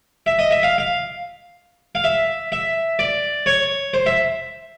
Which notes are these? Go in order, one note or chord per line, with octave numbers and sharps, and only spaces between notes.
E5
D#5
E5
F5
F5
F5
E5
E5
D5
C#5
C5
E5